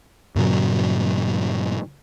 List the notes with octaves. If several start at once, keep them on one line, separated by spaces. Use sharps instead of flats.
G2 A#2 C#3 F#3